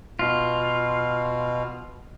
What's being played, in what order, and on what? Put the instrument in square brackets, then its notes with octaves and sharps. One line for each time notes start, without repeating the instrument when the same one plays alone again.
[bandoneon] B2 [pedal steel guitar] F4